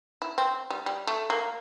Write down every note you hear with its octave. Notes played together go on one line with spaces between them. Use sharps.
E4
C4
G3
G3
A3
A#3